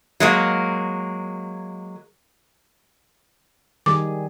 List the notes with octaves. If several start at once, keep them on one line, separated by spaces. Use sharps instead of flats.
F#3 G#3 A#3
D#3 G3 G#4 D6